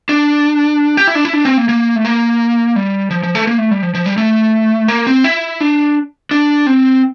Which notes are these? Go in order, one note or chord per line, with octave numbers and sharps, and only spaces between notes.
D4
G4
E4
D4
E4
D4
C4
A#3
A#3
A3
A#3
G3
F3
F3
A3
A#3
A3
G3
F3
F3
G3
A3
A#3
C4
E4
D4
D4
C4